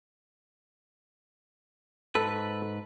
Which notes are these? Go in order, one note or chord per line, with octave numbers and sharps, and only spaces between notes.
G#2 A4 B4